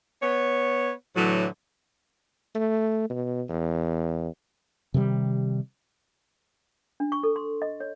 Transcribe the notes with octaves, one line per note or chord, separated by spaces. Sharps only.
B3 C#5
A2 D3 E3 F#3
A3
B2
E2
C3 D#3 F#3 G3
D4
C#6
A4
C6
D#5
C#5